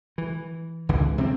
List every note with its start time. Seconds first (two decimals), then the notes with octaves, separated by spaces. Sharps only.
0.18 E3
0.89 G#1 C#2 D3 E3
1.18 C3 E3 C4